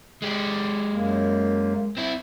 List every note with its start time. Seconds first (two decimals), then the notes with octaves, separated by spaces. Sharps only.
0.22 G#3 G4
0.92 F#2 A#3
1.97 C4 E4